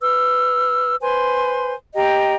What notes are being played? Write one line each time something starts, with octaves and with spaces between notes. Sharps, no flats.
B4 E6 F6
B4 C5 G#5 C6
G4 D#5 G5 A#5